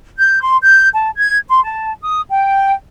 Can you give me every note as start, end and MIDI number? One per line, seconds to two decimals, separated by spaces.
0.17 0.38 91
0.42 0.56 84
0.63 0.88 91
0.93 1.10 81
1.16 1.38 92
1.48 1.62 84
1.64 1.93 81
2.02 2.21 87
2.30 2.72 79